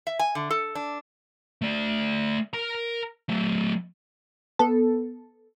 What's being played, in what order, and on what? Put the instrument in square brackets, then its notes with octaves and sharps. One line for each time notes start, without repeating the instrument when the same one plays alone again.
[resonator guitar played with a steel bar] E5
G#5
D3
A4
D4
[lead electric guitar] A3 D5
A#4 A#5
F#3 A3
[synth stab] B3 A4